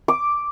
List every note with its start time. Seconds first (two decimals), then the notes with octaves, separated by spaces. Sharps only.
0.08 D6